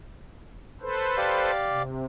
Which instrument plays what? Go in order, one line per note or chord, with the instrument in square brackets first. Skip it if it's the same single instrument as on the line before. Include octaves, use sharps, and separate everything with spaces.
[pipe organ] A4 B4 C5
[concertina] G4 D5 F5
[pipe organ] C3